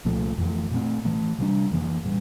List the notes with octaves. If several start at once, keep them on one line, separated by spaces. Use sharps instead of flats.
C2 A#2 F3 A3
F2 E3 A3
A#2 A3 C4
A2 E3 A3
C3 G3 D4
F2 E3 A#3
A2 G3